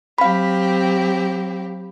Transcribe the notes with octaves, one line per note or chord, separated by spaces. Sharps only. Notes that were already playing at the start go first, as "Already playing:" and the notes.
F#3 C4 G4 F5 B5